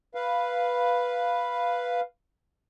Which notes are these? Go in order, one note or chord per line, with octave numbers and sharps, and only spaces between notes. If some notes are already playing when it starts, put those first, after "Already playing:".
B4 F5